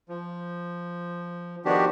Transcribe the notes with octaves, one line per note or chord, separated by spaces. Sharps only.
F3
D#3 F3 B3 D4 F#4 G4